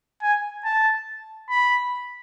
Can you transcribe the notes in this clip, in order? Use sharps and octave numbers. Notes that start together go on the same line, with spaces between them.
G#5
A5
B5